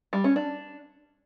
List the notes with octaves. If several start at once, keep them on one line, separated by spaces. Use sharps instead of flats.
G3
C#4
D4